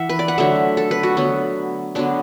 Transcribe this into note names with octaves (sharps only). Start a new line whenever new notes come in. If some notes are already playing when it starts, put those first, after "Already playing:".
Already playing: E3 E4 E5 F#5
B4
D5
F#5
D3 F#3 A3 E5
A4
B4
F#4
D3 F#3 B3
D3 F#3 B3 D4